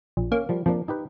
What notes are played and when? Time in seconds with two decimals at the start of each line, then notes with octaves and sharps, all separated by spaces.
0.17 A#1
0.32 A#3 C#4
0.49 F3 G3
0.66 F2 F3 A#3 D4
0.88 D#4 G4 B4